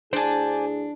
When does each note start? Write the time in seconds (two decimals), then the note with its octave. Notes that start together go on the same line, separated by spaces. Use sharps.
0.13 D2 D4 E4 G#4 C5 D5 G#5 A5